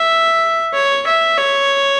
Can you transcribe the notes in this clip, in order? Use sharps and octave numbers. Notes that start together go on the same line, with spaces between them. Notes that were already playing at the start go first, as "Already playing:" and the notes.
Already playing: E5
C#5
E5
C#5